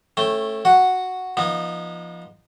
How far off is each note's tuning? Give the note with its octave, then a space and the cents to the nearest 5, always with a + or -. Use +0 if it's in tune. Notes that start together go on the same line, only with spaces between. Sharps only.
A3 +0 C#4 -25 G5 +0
F#4 +0 F#5 +0
F3 -20 B3 -35 D#4 -20